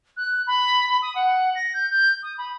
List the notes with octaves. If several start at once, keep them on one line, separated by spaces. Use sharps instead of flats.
F#6
B5
B5
D#6
F#5
A#6
G6
G6
D#6
B5